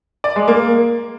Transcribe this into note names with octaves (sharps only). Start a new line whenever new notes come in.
D5
G#3
A#3